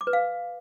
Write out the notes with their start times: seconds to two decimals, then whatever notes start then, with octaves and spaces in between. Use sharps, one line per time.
0.01 D6
0.07 B4
0.13 F5